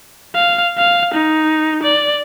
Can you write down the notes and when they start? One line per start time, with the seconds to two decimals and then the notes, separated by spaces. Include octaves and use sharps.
0.35 F5
0.78 F5
1.14 D#4
1.83 D5